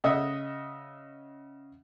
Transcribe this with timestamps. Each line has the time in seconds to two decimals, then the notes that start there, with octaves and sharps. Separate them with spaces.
0.04 C#3 D#5 E5 F#5 D#6